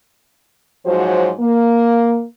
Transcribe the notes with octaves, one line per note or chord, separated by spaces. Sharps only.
G#2 F3 F#3 F#4 C5 C#5
A#3